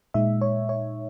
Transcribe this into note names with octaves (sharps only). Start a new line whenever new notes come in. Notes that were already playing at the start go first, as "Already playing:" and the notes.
A#2 G#3 D#4 E5
C#5
C#5